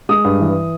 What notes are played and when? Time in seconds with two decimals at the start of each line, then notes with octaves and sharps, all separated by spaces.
0.09 G#3 D#6
0.24 G2
0.40 E3